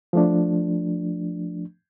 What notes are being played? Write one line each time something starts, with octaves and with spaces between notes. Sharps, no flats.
F3 A3 D4